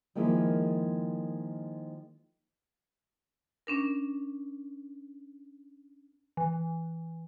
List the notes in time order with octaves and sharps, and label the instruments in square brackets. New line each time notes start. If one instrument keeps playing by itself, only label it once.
[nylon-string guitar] D#3 F3 G#3 A#3 E4 F4
[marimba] C#4 D4 A#4
[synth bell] E3